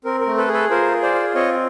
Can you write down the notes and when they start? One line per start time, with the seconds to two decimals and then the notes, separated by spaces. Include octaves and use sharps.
0.05 C4 A#4
0.21 A#4
0.26 A3
0.38 A4 B4
0.48 G#4
0.54 A4 B4
0.70 F4 A#4 C5
0.92 G#4
1.02 C5 D5
1.14 F4
1.35 C4 C#5 D#5